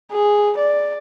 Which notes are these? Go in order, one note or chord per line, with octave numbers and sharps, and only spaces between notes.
G#4
D5